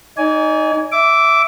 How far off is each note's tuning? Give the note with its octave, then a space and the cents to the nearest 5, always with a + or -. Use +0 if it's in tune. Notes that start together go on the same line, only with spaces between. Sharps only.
D#4 +0 D5 -40 G#5 +0
E5 +0 D6 -10